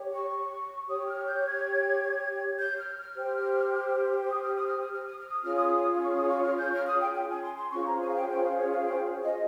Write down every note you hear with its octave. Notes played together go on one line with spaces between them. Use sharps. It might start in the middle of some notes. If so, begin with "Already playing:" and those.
Already playing: G4 C#5
C#6
G4 C#5 D#6
F6
G6
G#6
G6
F6
F6
G4 C5
D#6
F6
D#6
F6
D#6
F6
D#6
F6
D#6
C#4 F4 G#4 C#5 F6
D#6
C#6
D#6
C#6
F6
G6
F6
D#6
G5
G5
G#5
C6
C6
C#4 F4 G#4 C5 C#6
A#5
G#5
F5
G5
G5
F5
C#5
F5
G5
D#5